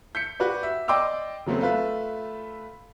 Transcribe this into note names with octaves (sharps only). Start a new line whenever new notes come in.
G6 B6 C#7
F#4 G4 B4 D5
E5
D5 D#5 G5 C6 D6 E6
C#3 F#3 A3 B3 C4
A3 F4 B4 E5